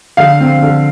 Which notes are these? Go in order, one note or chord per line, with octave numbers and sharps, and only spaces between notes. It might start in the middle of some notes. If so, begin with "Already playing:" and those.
D3 F5
C4
D3